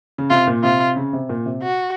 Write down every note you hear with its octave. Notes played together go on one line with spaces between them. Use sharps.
C#3
C3 F4
A#2
C3 F4
C#3
C3
A#2
C3
F#4